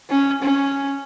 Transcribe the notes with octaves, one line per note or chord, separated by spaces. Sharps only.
C#4
C#4